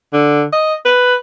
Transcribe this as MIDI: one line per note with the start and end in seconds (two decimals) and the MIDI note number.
0.13 0.44 50
0.53 0.74 75
0.85 1.15 71